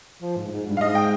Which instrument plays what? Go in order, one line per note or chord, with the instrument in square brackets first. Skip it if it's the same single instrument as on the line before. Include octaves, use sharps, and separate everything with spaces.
[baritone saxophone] F3
G#2
G#2
G2
[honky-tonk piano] F5
[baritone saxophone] G#2 [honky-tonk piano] D#5
[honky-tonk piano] G5